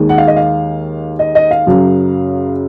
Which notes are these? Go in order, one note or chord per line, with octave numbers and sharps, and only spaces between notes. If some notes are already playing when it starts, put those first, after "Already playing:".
Already playing: D#2 D#3 G#3
F#5
F5
D#5
F5
D#5
D#5
F5
F#2 C#3 F#3